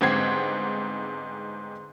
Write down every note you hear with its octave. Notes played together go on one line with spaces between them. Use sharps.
G1 G#2 C4 F#5 G#6 C7